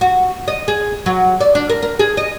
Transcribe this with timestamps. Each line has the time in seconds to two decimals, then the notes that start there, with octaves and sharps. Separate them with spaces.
0.01 F#4
0.48 D#5
0.68 G#4
1.06 F#3
1.41 D5
1.55 D4
1.70 A#4
1.83 A#4
1.99 G#4
2.17 D#5